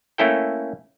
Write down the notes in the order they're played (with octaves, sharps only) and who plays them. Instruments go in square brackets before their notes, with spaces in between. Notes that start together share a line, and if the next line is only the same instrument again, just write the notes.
[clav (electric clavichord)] A3 A#3 C#4 E4 A4 G5